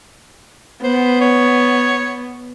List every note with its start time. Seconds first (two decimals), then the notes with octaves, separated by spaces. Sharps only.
0.84 B3 C5
1.21 C#5